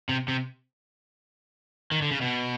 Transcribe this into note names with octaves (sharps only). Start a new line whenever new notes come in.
C3
C3
D#3
D3
C#3
B2